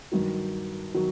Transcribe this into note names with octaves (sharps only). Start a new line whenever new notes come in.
G2 D#3 F#3
D#3 F#3